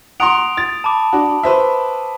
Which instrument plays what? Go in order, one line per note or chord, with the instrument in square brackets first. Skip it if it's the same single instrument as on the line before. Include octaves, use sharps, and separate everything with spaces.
[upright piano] F#5 A#5 C6 [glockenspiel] D#6 D7 F7
[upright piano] A6
[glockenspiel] A5 B5 D6
[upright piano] D4 F#4
B4 C5 E5